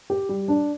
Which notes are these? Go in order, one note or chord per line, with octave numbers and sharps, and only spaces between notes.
G4
G3
D4